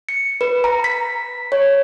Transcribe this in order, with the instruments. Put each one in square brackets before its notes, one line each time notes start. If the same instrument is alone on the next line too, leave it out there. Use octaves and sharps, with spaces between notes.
[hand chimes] C#7
B4
A#5
B6
C#5